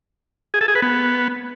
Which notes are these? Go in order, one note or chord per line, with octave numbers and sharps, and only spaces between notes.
G#4
A4
G#4
B4
B3